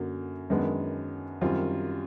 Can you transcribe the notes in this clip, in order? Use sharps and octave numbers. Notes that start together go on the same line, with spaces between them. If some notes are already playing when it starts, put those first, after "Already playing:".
Already playing: F#2 D3 F#3 A#3
F#2 D#3 G#3 B3 D4
F#2 D#3 G3 C4 F4